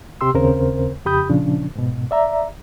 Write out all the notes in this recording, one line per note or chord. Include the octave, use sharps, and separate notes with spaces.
C3 G4 C6 E6
D#2 C#3 C4 A#4 C5
F2 C#3 G4 B5 D#6 G6
A#2 C#3 F3 C#4 D4
G#2 B2
D5 E5 A#5